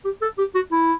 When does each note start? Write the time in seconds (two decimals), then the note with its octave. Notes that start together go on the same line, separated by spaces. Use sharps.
0.04 G4
0.22 A4
0.38 G4
0.55 F#4
0.72 E4